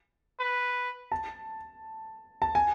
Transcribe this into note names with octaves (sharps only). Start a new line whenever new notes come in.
B4
A5
A5
G#5